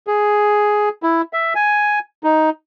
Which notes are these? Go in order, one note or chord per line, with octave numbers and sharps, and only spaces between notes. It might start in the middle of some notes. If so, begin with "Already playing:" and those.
G#4
E4
E5
G#5
D#4